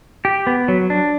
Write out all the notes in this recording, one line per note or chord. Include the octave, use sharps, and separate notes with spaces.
G4
B3
F#3
D4